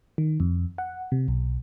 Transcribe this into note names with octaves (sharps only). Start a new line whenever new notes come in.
D#3
F2
F#5
C3
B1